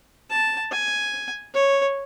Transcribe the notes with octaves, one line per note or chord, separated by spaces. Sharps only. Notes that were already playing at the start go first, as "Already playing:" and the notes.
A5
G#5
C#5